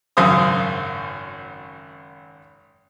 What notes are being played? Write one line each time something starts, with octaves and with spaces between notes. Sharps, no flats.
G#1 F#2 C#3 C5 D#6